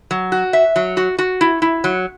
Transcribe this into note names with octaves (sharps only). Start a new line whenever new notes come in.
F#3
F#4
E5
F#3
F#4
F#4
E4
E4
F#3